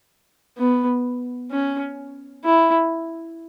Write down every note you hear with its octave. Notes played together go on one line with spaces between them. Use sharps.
B3
C#4
E4